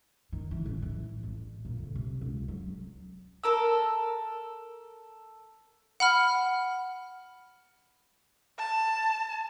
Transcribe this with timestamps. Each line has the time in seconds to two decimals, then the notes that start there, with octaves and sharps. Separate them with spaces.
0.32 D#3
0.51 E3
0.66 A1
0.82 E3
1.23 A1
1.65 A#2
1.79 D2
1.95 C3
2.21 C#2
2.48 F#3
3.44 A4 A#4 E6
6.00 F#5 B5 F6
8.59 A5